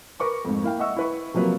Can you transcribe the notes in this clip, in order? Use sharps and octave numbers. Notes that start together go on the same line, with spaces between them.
A#4 B4 C#6 D6
F2 G#2
A#3 E4 F5 G5
D#5 E5 F#5 C#6 E6
E4 B4 C#6
C3 F3 F#3 A#3 B4